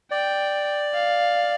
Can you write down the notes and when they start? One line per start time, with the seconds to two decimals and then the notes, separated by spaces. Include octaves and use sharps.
0.11 D5 G5
0.94 F5